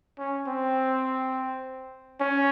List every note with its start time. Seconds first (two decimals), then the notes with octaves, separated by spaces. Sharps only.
0.19 C#4
0.47 C4
2.20 C#4